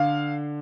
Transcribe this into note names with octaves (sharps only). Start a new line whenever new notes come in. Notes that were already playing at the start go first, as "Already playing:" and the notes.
Already playing: D3 F5